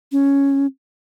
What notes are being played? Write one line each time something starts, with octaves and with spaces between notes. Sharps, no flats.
C#4